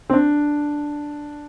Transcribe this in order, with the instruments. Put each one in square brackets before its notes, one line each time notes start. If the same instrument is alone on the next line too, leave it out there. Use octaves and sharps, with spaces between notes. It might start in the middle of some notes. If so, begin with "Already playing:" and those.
[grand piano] C4
D4